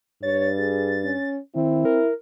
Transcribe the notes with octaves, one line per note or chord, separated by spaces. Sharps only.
G2 C#5 A6
G#4
C#4
D#3 C4 E4
A#4